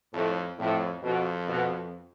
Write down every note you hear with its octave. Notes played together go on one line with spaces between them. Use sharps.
F2 A2
F2 A2
F2 B2
B2